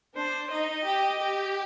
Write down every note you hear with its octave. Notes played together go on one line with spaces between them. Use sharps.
D4 C5
D#4 D#5
G4
G4